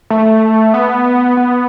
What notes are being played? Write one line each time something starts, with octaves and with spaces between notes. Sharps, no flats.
A3
B3
B3